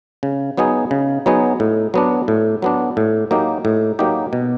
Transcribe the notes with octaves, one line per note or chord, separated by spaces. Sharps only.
C#3
F#3 B3 D#4 G#4
C#3
F#3 B3 D#4 G#4
A2
F#3 B3 D4
A2
F#3 B3 D4
A2
F#3 A#3 D#4 G4
A2
F#3 A#3 D#4 G4
B2